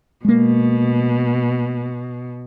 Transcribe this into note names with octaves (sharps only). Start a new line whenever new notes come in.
B2 G#3 A#3